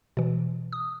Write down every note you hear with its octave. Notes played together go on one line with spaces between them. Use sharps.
B2 E3
D#6